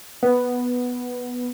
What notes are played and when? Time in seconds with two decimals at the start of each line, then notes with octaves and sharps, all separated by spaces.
0.23 B3